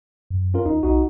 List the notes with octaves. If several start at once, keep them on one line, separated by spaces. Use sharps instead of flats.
F#2
C#4 F4 A#4
D#2 D#4
B1 D#4 F#4